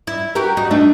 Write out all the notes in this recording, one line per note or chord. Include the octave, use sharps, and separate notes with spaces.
E4
F#4 G4 A#4
D#4 F#4
A3 D4 D#4